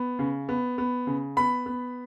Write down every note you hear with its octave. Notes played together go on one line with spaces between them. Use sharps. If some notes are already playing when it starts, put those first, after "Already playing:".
Already playing: B3
C#3
B3
B3
C#3
B3 B5
B3